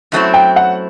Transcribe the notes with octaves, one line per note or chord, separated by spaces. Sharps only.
F#2 F#3 A3 C4 E4
G5
F#5